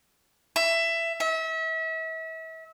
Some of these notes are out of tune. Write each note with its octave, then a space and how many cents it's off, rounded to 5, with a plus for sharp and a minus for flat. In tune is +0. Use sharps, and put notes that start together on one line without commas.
E5 +15
E5 -35